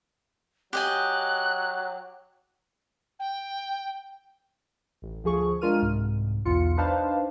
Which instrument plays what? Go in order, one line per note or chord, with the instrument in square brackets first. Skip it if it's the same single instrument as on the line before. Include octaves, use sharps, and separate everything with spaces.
[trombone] F#3 [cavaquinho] G4 D#5 G#5 [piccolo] F#6
[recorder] G5
[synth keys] A1
D2 F3 G#4 C#6
G#3 D4 F4 A#4 F6 D#7
C2 G#2
B1 E2 F4 C#7
D4 D#4 B4 C5 F5 A5